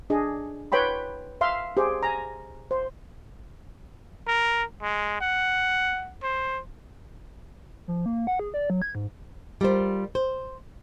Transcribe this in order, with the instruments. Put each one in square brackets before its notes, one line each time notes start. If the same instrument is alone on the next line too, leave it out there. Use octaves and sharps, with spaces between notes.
[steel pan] D4 G#4 D#5
B4 C#5 G5 B5 C6
E5 F5 C6
G4 G#4 C5
G#5 A#5
C5
[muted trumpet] A#4
G#3
F#5
C5
[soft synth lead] F3
A#3
F#5
G#4
D5
F#3
G#6
G#2
[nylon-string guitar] G3 F4 A#4 C5
C5